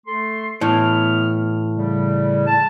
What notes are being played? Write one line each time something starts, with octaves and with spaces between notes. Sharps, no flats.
A3 A4 C6
A2 E3 B3 F6
C#3 G3
A5